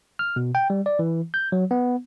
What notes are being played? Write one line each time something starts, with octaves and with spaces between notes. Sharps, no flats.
F6
B2
G5
G3
D5
E3
G6
F#3
B3